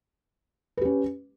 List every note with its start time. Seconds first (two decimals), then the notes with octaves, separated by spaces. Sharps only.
0.77 B4
0.81 G4
0.85 C#4